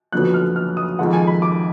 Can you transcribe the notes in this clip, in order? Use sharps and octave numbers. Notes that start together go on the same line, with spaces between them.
F#1 F2 D3 F#3 B3 F#6
F6
F6
D#6
F2 D#3 G#3 F#5
G#5
B5
D6